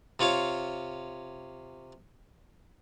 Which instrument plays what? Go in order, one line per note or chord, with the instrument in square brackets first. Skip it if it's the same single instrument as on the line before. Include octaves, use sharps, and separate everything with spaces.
[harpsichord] C3 F4 C#5 F5